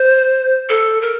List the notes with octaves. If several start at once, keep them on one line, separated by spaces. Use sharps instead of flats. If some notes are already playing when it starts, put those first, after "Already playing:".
Already playing: C5
A4
A#4